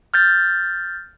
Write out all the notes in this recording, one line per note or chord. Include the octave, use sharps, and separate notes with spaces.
F6 G6 A6